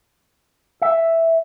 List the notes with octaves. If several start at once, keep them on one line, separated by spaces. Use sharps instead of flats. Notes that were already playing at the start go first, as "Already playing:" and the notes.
E5